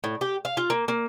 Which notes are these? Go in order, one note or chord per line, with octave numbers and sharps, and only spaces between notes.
A2
G4
F5
F4
A#3
A#3